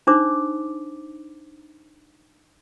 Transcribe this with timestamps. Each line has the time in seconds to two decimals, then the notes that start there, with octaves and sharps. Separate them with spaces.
0.07 D4 D#4 C5 D6